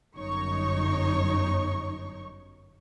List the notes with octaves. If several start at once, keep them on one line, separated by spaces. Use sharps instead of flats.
G1 F#2 D#4 C#5 C#6